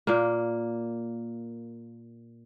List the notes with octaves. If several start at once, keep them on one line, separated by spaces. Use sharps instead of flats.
A#2 A#3